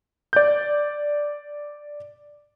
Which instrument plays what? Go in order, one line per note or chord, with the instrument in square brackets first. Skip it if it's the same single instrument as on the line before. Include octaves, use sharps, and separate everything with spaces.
[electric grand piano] D5 G6